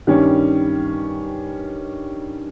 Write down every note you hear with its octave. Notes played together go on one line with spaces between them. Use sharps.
G2 D#3 G3 C#4